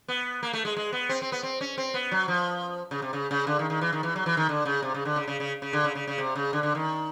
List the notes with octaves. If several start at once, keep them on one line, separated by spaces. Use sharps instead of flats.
B3
A#3
A3
G#3
G#3
B3
C4
C4
B3
C4
C#4
C4
B3
F#3
F3
C#3
C3
C#3
C#3
D3
D#3
D#3
E3
D#3
E3
F#3
E3
D#3
D3
C#3
C3
C#3
D3
C#3
C#3
C#3
C#3
D3
C#3
C#3
C#3
C3
C#3
D3
D3
D#3